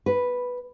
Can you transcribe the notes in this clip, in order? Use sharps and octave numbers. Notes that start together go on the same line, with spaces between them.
B4